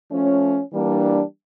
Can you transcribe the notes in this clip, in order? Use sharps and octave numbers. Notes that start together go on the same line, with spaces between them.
F3 A3 C#4
E3 G3 A#3 D4